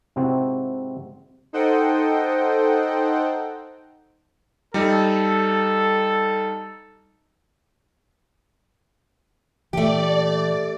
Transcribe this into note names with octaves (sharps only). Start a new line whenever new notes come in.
G#2 C3 C4 E4 F#4
D#4 A4 C5 D#5 F#5 G5
G3 D#4 A4
A#2 E3 A3 G4 D5